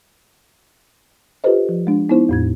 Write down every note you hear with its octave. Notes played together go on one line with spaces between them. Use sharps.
F4 G4 A4 B4 C5 D#5
F3
G#3 D4
B3 D#4 E4 C5
E2 A2 G#6